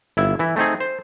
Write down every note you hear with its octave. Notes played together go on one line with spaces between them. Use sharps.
G1 E4 E5
E3 E4
A3 C4 D#4 G#4
C5